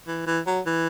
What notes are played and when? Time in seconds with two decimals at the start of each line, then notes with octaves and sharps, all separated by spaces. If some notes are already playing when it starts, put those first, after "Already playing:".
0.08 E3
0.27 E3
0.47 F#3
0.66 E3